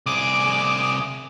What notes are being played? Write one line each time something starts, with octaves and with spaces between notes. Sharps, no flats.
C2 G#4 D6